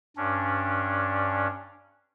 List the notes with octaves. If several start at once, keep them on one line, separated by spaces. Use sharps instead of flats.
G2 C#4 D4